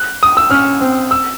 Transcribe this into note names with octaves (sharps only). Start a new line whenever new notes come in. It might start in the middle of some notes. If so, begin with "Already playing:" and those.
Already playing: F#6
D#6
E6
C#4 F6
C4
E6